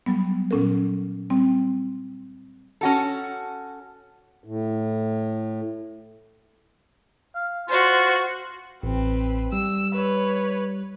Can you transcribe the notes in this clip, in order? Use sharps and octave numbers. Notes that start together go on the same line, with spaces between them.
F#3 G3 B3
A#2 F#3 C#4 A4 A#4
G3 C4
C#4 F#4 A4
A2
F5
F4 F#4 C5
A1 C4 B4
G3 E6
B4 C#5